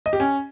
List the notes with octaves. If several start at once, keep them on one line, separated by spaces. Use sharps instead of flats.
D#5
G4
C#4